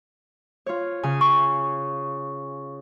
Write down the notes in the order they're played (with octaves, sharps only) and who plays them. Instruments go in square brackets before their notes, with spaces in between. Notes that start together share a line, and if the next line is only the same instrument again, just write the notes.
[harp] F4 C#5
C#3 G#5
[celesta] C#6